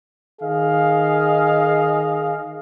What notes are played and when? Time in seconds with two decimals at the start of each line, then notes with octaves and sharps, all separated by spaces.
0.41 D#3 G#4 D#5 F5